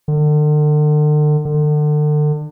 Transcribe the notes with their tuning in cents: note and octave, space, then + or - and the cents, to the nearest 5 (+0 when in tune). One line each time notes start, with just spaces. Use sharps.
D3 +40
D3 +35